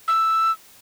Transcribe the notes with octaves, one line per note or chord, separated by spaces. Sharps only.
E6